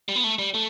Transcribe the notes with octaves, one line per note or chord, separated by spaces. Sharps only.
G3
B3
A3
G3
A3